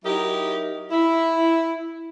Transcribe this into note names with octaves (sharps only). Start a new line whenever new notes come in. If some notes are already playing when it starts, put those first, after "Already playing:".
F#3 D#4 E4 G4 A#4 D#5
E4